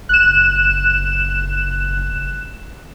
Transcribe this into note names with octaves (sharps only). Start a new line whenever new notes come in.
F#1 F#6 E7